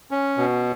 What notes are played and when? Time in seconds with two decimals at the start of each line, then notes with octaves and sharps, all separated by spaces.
0.11 C#4
0.38 B2